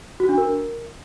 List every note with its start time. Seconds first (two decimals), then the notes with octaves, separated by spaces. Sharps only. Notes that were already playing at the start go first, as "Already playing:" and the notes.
0.20 F#4
0.29 D4
0.38 A#4